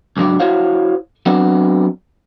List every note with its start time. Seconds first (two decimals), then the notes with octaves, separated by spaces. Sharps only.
0.17 C#2 G#2 F#3 D4 D5
0.40 E4 F#4 C5 C#5 F5
1.26 F#3 B3 C4 D4